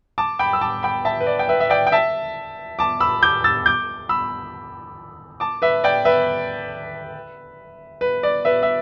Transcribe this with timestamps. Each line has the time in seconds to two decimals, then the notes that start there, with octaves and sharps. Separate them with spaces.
0.18 A5 D6
0.39 G5 B5
0.53 E6
0.61 A5 D6
0.83 G5 B5
1.05 E5 A5
1.20 B4
1.26 D5
1.39 G5
1.49 B4 E5
1.60 E5
1.70 D5 G5
1.87 G5
1.92 E5 A5
2.79 A5 D6
3.00 B5 E6
3.23 D6 G6
3.44 E6 A6
3.66 D6 G6
4.09 B5 E6
5.40 A5 D6
5.62 B4 E5
5.84 D5 G5
6.05 B4 E5
8.01 B4
8.23 D5
8.45 B4 E5
8.63 E5